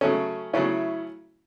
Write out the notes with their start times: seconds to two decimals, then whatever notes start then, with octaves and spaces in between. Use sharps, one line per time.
0.01 C#3 F#3 A3 C#4 A4
0.53 C#3 F#3 A3 C#4 E4